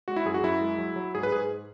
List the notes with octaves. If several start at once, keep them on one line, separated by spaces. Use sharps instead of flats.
G#3 F#4
E4
F#2 G#4
F#4
F#2 E4
G#3
F#3
F#3
G#2 G#4
B4
G#2 G#4